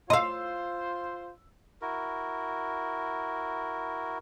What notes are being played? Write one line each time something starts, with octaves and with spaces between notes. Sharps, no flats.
F4 C5 D#5 F5 C6 E6
E4 F#4 A#4